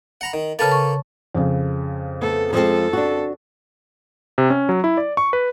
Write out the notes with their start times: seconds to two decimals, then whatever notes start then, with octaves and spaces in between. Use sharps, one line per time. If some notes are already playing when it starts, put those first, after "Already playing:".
0.21 F#5 A#5 B5
0.33 D#3
0.59 C#3 A#3 A4 B4 A5 A6
0.72 C#6
1.35 F2 C#3
2.22 A3 B3 A4
2.53 F3 G#3 C4 A4
2.93 D4 F#4
4.38 C3
4.50 C#4
4.69 F#3
4.84 E4
4.97 D5
5.17 C#6
5.33 B4